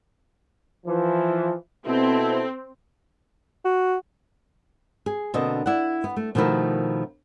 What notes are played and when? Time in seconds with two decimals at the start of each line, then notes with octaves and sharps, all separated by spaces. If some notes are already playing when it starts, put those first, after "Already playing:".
0.86 E3 F3
1.86 B2 C4 E4 A4
3.65 F#4
5.06 G#4
5.34 B2 D3 A#3 C4 D#5
5.66 E4 D5 F#5
6.04 B3
6.16 A3
6.35 B2 D#3 F3 A3 E4 A#4